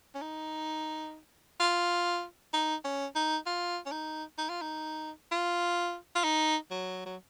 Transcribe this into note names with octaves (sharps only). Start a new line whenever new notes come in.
C#4
D#4
F4
D#4
C#4
D#4
F4
C#4
D#4
D#4
F4
D#4
F4
F4
D#4
F#3
F#3